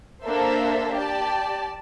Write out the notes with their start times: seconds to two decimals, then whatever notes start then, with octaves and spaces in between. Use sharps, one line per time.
0.24 A#3 D4 A4 C5 E5
0.95 G4 D5 A5